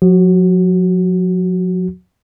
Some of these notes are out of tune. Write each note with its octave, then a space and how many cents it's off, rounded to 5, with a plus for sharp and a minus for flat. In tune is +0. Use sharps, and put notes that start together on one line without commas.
F#3 -45 F#4 +15